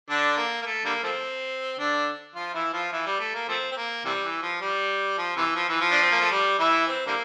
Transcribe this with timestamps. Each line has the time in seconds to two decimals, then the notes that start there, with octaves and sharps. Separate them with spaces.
0.10 D3 D4
0.37 A#3
0.62 A#3
0.66 A3
0.85 D3 G3 A#3
1.04 F3 A3 C4
1.79 D3 D4
2.35 F3 F4
2.54 E3 E4
2.73 F3 F4
2.92 E3 E4
3.06 G3
3.20 A3
3.35 A#3
3.49 F3 A3 C4
3.71 C4
3.77 A#3
4.05 C3 E3 G3
4.24 E3
4.43 F3
4.61 G3
5.18 F3
5.37 C3 E3
5.56 F3
5.69 E3
5.81 F3
5.91 D4
6.02 C4
6.12 A#3
6.21 A3
6.31 G3
6.59 E3 E4
6.87 C4
7.07 D3 G3 A#3